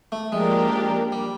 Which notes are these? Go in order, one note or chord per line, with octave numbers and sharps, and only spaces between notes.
A3
F3 G#3 A#3 D4 G4 A#4
G3